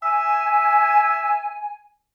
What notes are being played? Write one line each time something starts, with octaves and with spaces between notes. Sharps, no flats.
E5 G#5